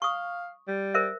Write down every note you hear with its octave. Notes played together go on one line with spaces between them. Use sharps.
F5 C#6 D#6
G3
A#4 C5 E5